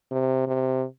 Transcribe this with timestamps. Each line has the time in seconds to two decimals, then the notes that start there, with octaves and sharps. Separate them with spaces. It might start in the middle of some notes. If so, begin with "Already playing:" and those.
0.12 C3
0.47 C3